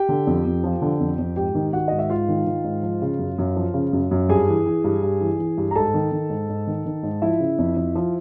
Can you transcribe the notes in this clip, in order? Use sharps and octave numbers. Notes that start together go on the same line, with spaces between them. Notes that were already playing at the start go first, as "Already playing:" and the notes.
Already playing: G4 G5
D3
F2
F2
F3
D3
F2
F2
G#2 G4 G5
D#3
D#3 F#4 F#5
G#2 D#5
E5
G#2 F4 F5
D#3
D#3
G#2
F3
C#3
F#2
F#2
F3
C#3
F#2
F#2
G2 G#4 G#5
E3
E3
G2
G2
E3
E3
G2
A#5
G#2 A4 A5
D#3
D#3
G#2
G#2
D#3
D#3
G#2
F3 E4 E5
C#3
F2
F2
F3